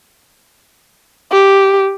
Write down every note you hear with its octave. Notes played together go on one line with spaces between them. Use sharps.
G4